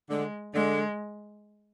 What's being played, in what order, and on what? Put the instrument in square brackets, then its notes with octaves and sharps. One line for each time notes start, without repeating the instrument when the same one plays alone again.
[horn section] D3 [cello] G#3
[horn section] D3 [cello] G#3